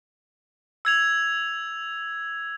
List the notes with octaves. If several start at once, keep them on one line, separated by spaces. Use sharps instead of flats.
E6 G#6 F7